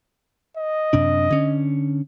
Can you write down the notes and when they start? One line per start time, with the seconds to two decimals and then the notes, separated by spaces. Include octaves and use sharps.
0.56 D#5
0.93 F#2 C3 D4
1.30 D3 C#4